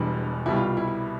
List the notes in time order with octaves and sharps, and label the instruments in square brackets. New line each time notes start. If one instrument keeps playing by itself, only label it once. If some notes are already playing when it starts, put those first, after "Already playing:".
Already playing: [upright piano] E1 E2 B2 G3 D4
C2 B2 G3 E4
F4
F4
E4
E4